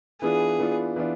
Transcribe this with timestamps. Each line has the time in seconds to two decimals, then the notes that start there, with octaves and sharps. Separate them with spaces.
0.21 E3 B3 D4 F4 G#4
0.59 E3 B3 D4 F4
0.96 E3 B3 D4 F4